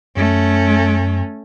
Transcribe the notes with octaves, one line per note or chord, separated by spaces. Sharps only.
F#2 A3 C#4